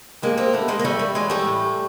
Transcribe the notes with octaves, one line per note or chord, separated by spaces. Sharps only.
G2 G#3 A#3
A#3 C4
G2 A3 B3
G#3 A#3
A#3
E3 G3 A3
G3
E3 F#3 G#3
G3 A3
A2